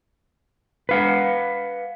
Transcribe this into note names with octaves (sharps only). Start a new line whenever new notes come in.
B4 F5 F#5